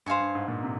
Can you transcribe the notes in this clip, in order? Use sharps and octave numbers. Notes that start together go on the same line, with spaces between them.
G2 C5 F5 G#5 C#6
G2
G#2
A#2
C3